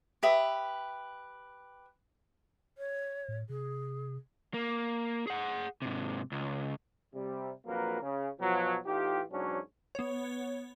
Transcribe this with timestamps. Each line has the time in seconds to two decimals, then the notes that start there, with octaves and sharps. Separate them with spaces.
0.23 G4 B4 E5 D#6
2.78 C#5
3.28 A2
3.49 C3 G#4
4.54 A#3
5.27 G#4 F#5
5.82 G#2 C3
6.32 C#2
7.14 C3 G3
7.66 A#1 F2 F#3 A#3 A#4 B4
8.02 C#3
8.40 B2 F3 F#3
8.85 A2 E3 D#4 F4 G4
9.31 E2 G#2 B2 F#3 C#4 D4
9.95 B3 C#5